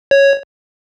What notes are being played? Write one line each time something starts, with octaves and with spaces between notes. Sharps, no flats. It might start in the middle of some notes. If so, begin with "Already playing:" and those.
C#5